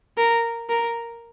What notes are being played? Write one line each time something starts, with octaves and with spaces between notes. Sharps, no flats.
A#4
A#4